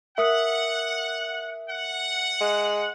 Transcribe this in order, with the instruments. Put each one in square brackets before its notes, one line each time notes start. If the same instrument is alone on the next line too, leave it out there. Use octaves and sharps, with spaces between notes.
[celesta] A#4 D#6 [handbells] E5 [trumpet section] F#5
[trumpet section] F#5
[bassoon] G#3